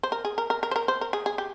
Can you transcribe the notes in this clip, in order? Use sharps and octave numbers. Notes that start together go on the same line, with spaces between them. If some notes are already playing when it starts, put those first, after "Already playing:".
C5
A#4
G#4
A#4
A#4
A#4
C5
A#4
C5
A#4
G#4
G#4
G4